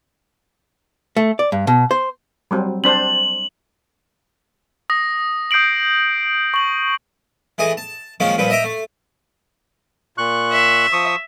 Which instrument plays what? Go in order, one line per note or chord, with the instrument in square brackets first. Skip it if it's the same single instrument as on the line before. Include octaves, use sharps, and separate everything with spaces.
[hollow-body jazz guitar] A3
D5
G2
B2
C5
[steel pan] F#3 G3 C4
[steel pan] C4 D4 C5 [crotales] F#7
[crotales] D#6 A#6
D#6 G6 C7 D7 F#7
C#6 F#7
[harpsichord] E3 A3 G#4 D#5
A5
D#3 F3 G#3 A#3 C#4
G2 A#2 F3 B4
D#5 E5 G5 A#5 D6
A3
[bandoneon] A#2 C#6 F#6
[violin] E5
[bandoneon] F3 C#6 D#6